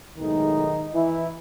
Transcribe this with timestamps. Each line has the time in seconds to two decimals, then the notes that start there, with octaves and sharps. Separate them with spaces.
0.18 B1 A2 D#3 G#3 D#4
0.93 E3 E4